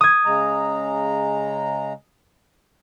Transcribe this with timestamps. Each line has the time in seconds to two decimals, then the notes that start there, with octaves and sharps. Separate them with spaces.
0.01 D#6 G#6
0.25 C#3 G#3 A#5